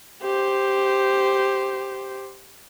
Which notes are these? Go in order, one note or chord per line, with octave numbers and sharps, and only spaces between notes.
G4 C5